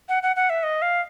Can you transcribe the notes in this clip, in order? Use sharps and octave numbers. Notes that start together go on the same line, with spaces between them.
F#5
F#5
F#5
E5
D#5
F5